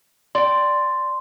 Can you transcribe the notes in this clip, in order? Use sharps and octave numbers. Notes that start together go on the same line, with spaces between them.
D5 G5 C6